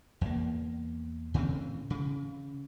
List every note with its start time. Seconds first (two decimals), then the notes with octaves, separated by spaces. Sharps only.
0.21 E2 A#3
1.34 A2 C#3 E3 C4
1.90 C#3